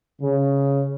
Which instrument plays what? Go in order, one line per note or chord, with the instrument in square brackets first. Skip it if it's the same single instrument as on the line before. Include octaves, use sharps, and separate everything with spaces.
[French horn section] C#3